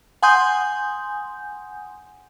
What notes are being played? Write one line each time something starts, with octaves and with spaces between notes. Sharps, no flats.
F#5 G#5 C6 D#6 G6